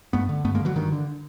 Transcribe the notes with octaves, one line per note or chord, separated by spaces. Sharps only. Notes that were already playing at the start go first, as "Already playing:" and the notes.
G2 A3 B3
D3
G2 A3 B3
G#3 A#3
D3 E3 F#3
G2 D#3
D3